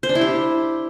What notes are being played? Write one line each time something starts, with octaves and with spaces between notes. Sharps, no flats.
C5
D4
E4
G4